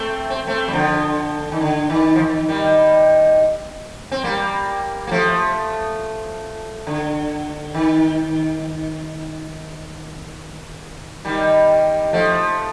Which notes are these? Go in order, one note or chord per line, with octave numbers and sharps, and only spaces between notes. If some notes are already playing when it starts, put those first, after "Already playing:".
Already playing: A3 C4
C4
A3 C4
G3
D3 F3
D#3
D3
D#3
F3
D#3
D#3 G3
C4
G3 A#3
A#3
F3 A3
D3
D#3
D#3 G3
F3 A3